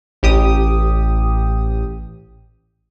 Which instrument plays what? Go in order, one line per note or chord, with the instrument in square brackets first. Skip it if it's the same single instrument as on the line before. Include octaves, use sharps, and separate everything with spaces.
[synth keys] A1 G4 D#6